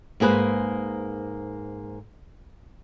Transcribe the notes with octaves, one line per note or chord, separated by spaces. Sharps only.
G#2 A#3 G#4 B4 C5